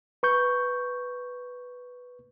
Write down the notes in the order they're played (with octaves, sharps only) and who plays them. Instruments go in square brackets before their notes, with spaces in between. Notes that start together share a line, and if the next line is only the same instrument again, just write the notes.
[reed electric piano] B4 C#6 G6